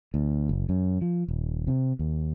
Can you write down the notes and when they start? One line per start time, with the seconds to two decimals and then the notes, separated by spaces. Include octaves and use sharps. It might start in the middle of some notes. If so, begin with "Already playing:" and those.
0.14 D2
0.49 F#1
0.69 F#2
1.01 F3
1.28 D#1
1.67 C3
1.99 D#2